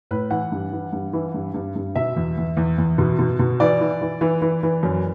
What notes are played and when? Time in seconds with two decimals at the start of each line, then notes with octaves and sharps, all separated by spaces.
0.11 A2 B4
0.31 E3 F#5
0.52 G2
0.73 E3
0.93 G2
1.13 E3
1.34 G2
1.54 G2
1.76 G2
1.95 B2 E5
2.16 E2
2.37 E2
2.57 E2
2.78 E2
2.98 B2
3.19 B2
3.39 B2
3.60 E3 D5
3.81 E3
4.01 E3
4.21 E3
4.42 E3
4.63 E3
4.83 F#2